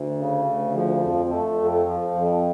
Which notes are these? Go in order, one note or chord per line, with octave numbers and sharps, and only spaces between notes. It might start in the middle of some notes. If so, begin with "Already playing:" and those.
Already playing: D2
C#3
D2
F3
F2
A3
F2
F3
F2